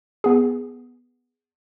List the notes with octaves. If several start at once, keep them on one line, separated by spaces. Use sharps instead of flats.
B3 G#4